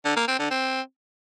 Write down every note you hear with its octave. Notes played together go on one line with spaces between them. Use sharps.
D3
A#3
C4
D3
C4